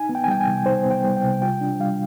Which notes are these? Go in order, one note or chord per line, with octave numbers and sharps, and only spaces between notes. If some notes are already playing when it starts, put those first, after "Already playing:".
Already playing: D#4 G#5
B3
G5
G#5
G3 G5
G#5
C3
D#4 C5
B3
G5
G3
G5
C3
F4 G5
D4
G3 F5